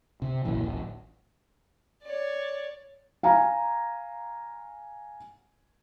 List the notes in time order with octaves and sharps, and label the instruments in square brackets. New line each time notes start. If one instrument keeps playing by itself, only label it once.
[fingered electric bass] C3
A1 F#2 A#2 E3
D1 A1
[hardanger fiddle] C#5 D5
[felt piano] F5 G#5 A#5